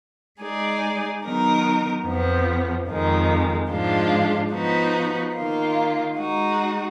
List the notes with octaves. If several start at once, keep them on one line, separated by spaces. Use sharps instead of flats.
G#3 D#4 G#4 D5
D#3 F#3 B3 D#4 A#4
F2 F3 B3
F2 D#3 G#3
G#2 F3 G#3 D4 F4
F3 B3 D#4 F#4 B4
D#3 A#3 F4
G#3 D#4 F#4